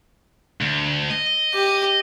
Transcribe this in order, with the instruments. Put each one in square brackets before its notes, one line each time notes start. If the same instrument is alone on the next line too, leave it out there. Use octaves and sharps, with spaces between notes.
[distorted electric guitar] D2
D#5
[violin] G4